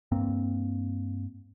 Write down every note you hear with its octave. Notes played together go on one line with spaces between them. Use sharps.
G2 A#3 C4